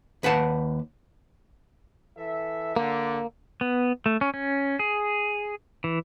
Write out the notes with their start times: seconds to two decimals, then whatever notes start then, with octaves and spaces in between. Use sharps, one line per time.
0.23 D#2 B4 F#5 A5
2.18 E3 A4 E5
2.76 D3 A#3
3.61 B3
4.06 A3
4.21 C#4
4.34 C#4
4.79 G#4
5.84 E3